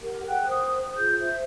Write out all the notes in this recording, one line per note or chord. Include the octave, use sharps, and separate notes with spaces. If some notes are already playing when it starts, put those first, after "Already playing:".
G4 A#4 F#5
G#4 F#5 G5 F#6
C5 D#6
F4 G#4 G6
C5 E5